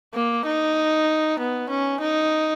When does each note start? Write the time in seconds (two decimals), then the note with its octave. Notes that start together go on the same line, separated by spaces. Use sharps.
0.14 A#3
0.46 D#4
1.39 B3
1.69 C#4
2.01 D#4